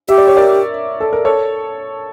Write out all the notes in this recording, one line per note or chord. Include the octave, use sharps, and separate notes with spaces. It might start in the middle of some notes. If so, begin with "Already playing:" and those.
G4 E5
D5
C#5
A#4 D5
A4
A#4
A4 C#5